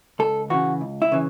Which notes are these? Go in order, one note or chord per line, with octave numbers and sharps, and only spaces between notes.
C#2 A4
C#3 E3 F#4
C#2
E4
C#3 E3